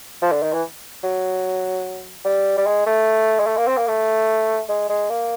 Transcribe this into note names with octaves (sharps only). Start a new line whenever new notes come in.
F3
D3
D#3
E3
F#3
G3
G3
G#3
A3
G#3
A3
A#3
C4
A#3
A3
G#3
G#3
A#3